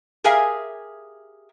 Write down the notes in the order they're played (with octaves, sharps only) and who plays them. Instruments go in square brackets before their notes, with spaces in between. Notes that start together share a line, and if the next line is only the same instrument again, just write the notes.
[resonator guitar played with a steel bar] G4 G#4 A#4 E5 F5 G#5